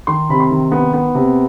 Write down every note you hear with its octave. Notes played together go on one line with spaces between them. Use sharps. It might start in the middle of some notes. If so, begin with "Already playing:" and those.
D#3 C6
C3 B5
C6
D#3
B3
B3
C3